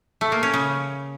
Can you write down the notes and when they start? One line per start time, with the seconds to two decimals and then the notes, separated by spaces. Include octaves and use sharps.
0.21 A3
0.32 A#3
0.43 C#4
0.54 C#3